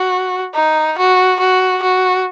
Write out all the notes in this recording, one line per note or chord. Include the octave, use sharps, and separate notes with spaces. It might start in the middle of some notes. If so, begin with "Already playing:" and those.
Already playing: F#4
D#4
F#4
F#4
F#4